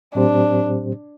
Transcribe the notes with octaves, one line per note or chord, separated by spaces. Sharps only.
A2 F#3 C4 D4 G4 C5